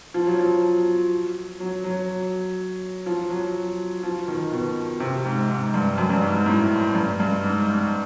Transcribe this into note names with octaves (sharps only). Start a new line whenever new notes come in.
F3
F#3
F3
F#3
F#3
F3
F#3
F3
D#3
B2
C3
G#2
G#2
G2
F#2
G2
G#2
G#2
A2
G2
G2
G#2
G#2